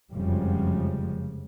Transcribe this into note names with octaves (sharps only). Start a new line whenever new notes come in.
F1 F#2 C#3 F3 G3 G#3